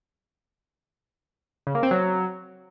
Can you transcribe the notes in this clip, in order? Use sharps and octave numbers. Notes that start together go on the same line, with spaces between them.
C#3
A#3
C4
F#3